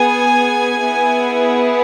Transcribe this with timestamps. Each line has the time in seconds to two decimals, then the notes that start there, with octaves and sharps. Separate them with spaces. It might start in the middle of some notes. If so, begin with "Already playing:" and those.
Already playing: B3 G#4 G#5
0.80 B3 E4 G#4